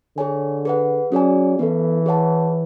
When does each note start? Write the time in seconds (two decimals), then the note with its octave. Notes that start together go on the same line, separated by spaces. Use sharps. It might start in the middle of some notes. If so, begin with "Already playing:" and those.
0.17 D3 G#4 C#5 G#5
0.65 G#4 B4 F#5
1.12 F#3 C#4 G#4 D5 G#5
1.59 E3 B3 E4 A4
2.06 G#4 C#5 F#5 A5